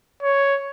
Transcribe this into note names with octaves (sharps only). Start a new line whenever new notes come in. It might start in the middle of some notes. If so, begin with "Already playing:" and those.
C#5